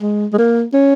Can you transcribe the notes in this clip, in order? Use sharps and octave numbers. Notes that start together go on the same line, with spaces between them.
G#3
G#3
A#3
C#4